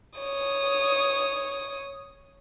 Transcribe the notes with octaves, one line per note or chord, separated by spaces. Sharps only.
C#5 D#6